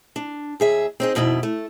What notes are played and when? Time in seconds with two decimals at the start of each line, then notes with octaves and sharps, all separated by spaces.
0.16 D4
0.60 D#2 G#4 E5
1.00 C4 D#4 G#4
1.15 F2 B2 D#3 E4
1.43 A3